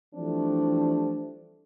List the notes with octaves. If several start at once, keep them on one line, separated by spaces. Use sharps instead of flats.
E3 F3 G3 A3 C4 D4